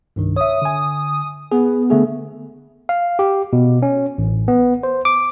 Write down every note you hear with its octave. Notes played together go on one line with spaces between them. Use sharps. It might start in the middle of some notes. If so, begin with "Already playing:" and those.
C2 G2 D#3
C#5 E5 D#6
D3 G#5
B3 G#4
D3 A3 G#4
F5
G4
B2
C#4
A1
B3
C5
D6